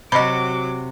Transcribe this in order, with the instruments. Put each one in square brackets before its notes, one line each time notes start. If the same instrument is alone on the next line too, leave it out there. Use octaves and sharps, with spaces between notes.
[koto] C3 F#4 [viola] F#3 D6 [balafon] D#5 B5